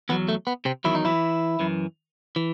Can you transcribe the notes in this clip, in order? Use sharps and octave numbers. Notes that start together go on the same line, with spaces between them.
E2 D#3 F#3 B3
A3
B3
C3 C4
E2 D#3 F#3 E4
D#4
E3 E4
F#2 E3
E3